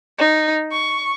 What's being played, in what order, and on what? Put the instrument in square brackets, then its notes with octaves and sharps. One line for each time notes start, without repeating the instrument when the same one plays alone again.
[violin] D#4
C#6